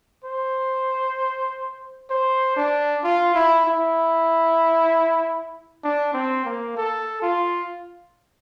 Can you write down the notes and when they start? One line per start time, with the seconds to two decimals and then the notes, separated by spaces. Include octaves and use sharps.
0.24 C5
2.10 C5
2.56 D4
3.04 F4
3.35 E4
3.66 E4
5.84 D4
6.14 C4
6.45 A#3
6.77 A4
7.22 F4